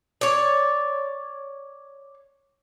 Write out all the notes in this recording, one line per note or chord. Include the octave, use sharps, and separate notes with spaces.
C#5 D5